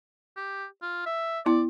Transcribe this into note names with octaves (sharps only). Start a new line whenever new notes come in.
G4
F4
E5
B3 E4 D5